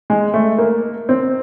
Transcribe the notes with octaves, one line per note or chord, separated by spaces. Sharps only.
G#3
A3
A#3
C4